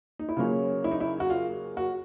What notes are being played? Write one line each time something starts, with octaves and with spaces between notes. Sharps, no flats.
D#4
E4
C#3 F#3 A#3 C#4 F4
E4
D#4
E4
F#4
F4
F#4